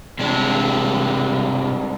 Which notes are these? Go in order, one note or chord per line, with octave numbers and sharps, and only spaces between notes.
C2 C3 G#3 D4